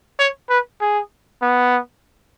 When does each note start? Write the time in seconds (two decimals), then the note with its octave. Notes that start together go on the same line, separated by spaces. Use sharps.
0.19 C#5
0.49 B4
0.81 G#4
1.42 B3